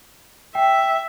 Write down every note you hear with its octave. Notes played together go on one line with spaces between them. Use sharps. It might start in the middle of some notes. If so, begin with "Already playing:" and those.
E5 G5